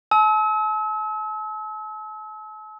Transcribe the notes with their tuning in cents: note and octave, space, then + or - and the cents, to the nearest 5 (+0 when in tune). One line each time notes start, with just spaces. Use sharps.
A5 -40 E6 -40